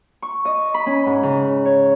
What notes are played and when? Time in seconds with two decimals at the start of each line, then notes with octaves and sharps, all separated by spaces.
0.22 C#6
0.45 D#5
0.74 B5
0.86 C#4
1.06 G#2
1.23 C#3
1.66 C#5